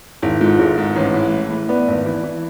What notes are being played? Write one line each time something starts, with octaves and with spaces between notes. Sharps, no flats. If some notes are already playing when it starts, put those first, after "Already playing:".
G#1 E4 G#4
G#2 F4 A4
A4
G#1 E4 G#4
G#2
A1
E3
A2
A2
B3 B4 D5
G#1
E3
E3